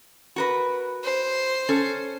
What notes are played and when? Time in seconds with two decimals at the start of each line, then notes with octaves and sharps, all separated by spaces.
0.36 F#4 A#4 B4
1.03 C5
1.69 C#4 A4